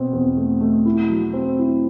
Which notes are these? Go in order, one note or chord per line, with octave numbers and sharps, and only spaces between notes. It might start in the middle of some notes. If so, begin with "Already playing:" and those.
Already playing: B2 C4
E2
A3
A3
E4
F#3
C4
E4